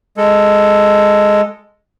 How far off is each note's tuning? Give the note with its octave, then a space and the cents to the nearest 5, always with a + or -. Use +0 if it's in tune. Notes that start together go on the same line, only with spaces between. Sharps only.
G#3 +0 A4 +0